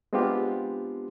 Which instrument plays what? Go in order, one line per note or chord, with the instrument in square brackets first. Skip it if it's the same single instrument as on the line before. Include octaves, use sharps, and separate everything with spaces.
[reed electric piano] G#3 B3 C4 D4 F4 G4